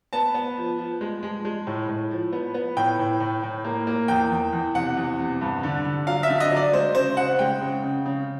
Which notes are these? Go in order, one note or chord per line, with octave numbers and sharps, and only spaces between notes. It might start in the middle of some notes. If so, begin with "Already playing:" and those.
B3 A5
B3
F3
F3
G#3
G#3
G#3
A2
A2
F3
B3
B3
A2 G5
A2
A2
A2
A#3
A#3
E2 G5
E2
E2
C3 F#5
E2
C3
G2
D3
D3
F#3 F5
E5
D3
D#5
F#3
D5
G#3 C5
C#3 C5
C#3 F#5
G#3 G5
C#3
C#3
C#3